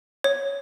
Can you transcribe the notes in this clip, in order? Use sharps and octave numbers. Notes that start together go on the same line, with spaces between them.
C#5